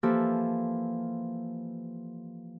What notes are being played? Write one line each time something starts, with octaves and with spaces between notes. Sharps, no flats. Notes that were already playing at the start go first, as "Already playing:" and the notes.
E3 F3 A#3 G4 A4